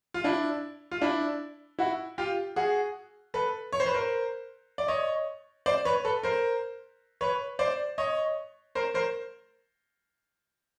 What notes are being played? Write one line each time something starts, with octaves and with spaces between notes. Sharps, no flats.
F4
D4 E4
F4
D4 E4
E4 F#4
F4 G4
F#4 G#4
A4 B4
C#5
C5
B4
A#4 C5
D5
C#5 D#5
C5 D5
B4 C#5
A4 B4
A#4 C5
B4 C#5
C5 D5
C#5 D#5
A#4 C5
A#4 C5